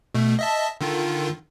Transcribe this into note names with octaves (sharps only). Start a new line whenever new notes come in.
B2 A3
D#5 E5 A5
D3 D#3 F4